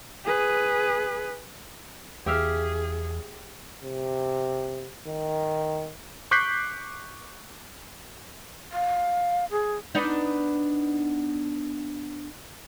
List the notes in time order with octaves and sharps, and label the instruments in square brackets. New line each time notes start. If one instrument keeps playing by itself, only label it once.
[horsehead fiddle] G#4 B4
[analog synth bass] E2 [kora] G4 E5 F5 [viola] G#4
[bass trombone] C3
D#3
[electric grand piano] C#6 D6 F#6 G6 B6 C7
[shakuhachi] F5
G#4
[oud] B3 D4 D#4